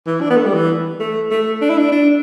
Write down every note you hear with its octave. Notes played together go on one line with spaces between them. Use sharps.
E3
D4
B3
A3
G3
E3
A3
A3
D4
E4
D4
D4